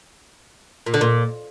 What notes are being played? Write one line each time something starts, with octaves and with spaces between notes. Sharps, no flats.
A#2
D3
A#2